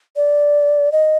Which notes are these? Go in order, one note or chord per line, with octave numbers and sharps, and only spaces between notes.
D5
D#5